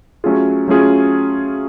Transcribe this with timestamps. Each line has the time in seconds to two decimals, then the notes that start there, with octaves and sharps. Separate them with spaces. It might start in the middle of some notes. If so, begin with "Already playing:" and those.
0.24 F#3 A3 C#4 F4 G#4
0.68 F#3 A3 C#4 F4 G#4